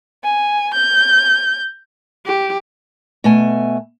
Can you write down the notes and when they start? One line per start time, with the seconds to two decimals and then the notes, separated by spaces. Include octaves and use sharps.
0.24 G#5
0.74 G6
2.26 G4
3.24 B2 A3 G#5